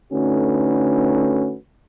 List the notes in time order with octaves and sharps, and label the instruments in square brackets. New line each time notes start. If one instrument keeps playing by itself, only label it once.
[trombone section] D3 A3 C#4 D#4 F#4 B4